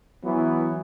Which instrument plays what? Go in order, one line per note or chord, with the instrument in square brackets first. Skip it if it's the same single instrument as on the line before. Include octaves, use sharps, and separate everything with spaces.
[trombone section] E3 F#3 B3